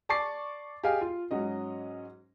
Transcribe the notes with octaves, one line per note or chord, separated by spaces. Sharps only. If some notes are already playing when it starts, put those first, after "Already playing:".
D5 A5 C#6 D6 A6 C7
G4 G#4 D#5 F5 G#5
F4
G#2 F#3 C#4 D#5